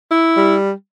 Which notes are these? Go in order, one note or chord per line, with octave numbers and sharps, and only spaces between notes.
E4
G3